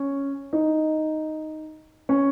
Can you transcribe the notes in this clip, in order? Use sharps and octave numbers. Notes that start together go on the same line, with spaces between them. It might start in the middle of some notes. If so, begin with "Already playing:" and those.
Already playing: C#4
D#4
C#4